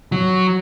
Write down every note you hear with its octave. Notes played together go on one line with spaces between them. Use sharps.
F#3